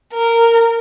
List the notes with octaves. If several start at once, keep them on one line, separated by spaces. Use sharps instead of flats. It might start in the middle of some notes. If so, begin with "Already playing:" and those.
A#4